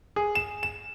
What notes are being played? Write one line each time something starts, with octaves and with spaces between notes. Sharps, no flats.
G#4
E7
E7